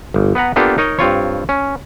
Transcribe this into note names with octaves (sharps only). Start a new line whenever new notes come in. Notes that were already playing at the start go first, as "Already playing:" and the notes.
G1
B3 B4 F#5 A#5
A#3 B3 D4 F4 G4 A4
D#4 A#4 C#5 D#5
G2 C4 F4 C#5
C#4